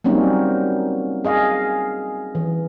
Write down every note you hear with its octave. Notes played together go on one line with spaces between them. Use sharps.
F#3 G3 A#3 C4 C#4 D#4
G#4 D#5 F5
E3